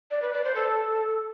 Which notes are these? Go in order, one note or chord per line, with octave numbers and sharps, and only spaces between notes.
D5
B4
D5
C5
A4